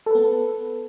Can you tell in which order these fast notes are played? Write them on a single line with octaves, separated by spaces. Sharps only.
A4 B4 B3